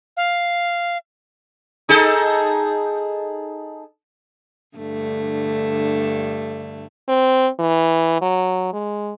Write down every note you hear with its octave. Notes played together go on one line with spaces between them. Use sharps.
F5
D#4 G#4 A4
G2 D3 A3
C4
E3
F#3
G#3